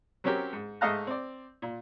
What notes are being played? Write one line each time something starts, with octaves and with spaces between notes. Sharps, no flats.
F#3 C4 C#4 G4 A#4
G#2
G#2 A3 D#5 F5 A#5 F#6
C4 D5
A#2